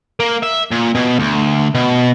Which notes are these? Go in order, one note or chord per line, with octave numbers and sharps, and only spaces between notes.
A#3
E5
A#2
B2
D2
B2